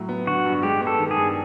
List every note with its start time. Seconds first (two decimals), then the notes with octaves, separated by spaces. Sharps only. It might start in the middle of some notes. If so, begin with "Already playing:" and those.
Already playing: A2 F#3
0.09 B3
0.27 D3 F#4
0.45 G2
0.62 G#3 G4
0.81 B3
0.87 A4
0.99 D#3
1.11 G#4
1.16 G2